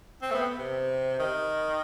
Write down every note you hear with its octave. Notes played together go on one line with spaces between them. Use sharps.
C4
A3
B3
C3
D#3